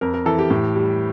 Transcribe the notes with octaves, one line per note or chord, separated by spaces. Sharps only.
F2 A#4
A#4
E3 A4
G4
A2
G3